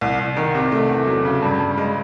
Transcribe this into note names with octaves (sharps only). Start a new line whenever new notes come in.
C2
C2
D#3
C3
A3
E2
F#3
C#3
G2
G2
G#3